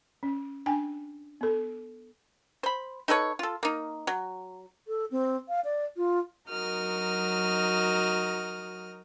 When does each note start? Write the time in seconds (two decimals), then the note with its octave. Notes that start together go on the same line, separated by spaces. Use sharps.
0.23 C#4
0.66 D4 G5 G#5
1.41 B3 A4
2.63 C5 B5
3.08 D#4 A4 B4 C#5
3.39 F4 A4
3.63 A#3 D#4
4.07 F#3
4.88 A4
5.11 C4
5.49 F5
5.65 D5
5.97 F4
6.49 F#3 D#4 F#4 A#4 D#6 F6